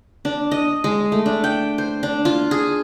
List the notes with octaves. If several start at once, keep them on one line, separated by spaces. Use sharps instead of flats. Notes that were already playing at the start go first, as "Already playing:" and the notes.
D4
D#5
G#3
A3
D4
G5
C5
D4
F4
G#4